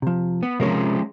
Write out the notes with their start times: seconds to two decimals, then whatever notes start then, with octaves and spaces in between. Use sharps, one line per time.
0.02 C3 F3
0.43 B3
0.60 C3 F3 G#3 C#4 A#4 C#5